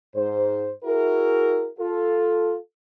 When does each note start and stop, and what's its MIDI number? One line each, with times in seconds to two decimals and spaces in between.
0.16 0.70 44
0.16 0.70 72
0.84 1.67 64
0.84 1.67 66
0.84 1.67 68
0.84 1.67 70
1.80 2.56 65
1.80 2.56 69